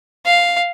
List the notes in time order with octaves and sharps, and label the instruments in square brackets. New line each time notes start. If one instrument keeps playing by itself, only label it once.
[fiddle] F5